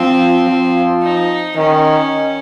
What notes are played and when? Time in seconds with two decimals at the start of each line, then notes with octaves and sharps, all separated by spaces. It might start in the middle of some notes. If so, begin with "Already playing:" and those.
Already playing: F3 C4
0.46 F3
1.02 D#4
1.57 D#3 C#4